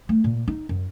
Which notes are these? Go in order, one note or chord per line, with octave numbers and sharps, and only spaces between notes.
A3
A#2
D#4
F#2